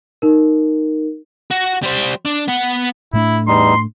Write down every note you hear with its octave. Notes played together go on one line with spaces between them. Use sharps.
D#4 A#4
F#4
G3 C5
D4
B3 F#5
A2 A3 D4 E4
E2 G3 D#4 C6